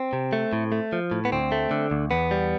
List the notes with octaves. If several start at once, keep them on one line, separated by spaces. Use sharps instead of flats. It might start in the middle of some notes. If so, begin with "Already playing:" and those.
Already playing: C4
C3
A3
A2
A3
F3
A2
B3
D2 C4
A3
D3
D2
E2 B3
G3